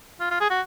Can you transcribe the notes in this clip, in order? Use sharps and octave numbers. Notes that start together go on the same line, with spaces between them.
F4
F4
G#4
F#4